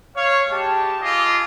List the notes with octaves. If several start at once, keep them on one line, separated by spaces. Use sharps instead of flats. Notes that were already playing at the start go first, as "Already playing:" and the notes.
C#5 F5
G#3 G4 A5
F4 G#4 D#5 D6